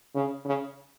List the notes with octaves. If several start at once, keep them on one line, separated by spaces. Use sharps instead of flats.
C#3
C#3